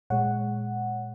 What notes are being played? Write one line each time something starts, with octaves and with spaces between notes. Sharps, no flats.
A#2 G#3 C#5 F#5